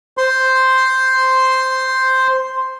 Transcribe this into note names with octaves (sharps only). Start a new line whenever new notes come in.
C5 C6